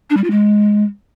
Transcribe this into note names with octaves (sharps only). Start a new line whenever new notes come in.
D4
G3
F4
G#3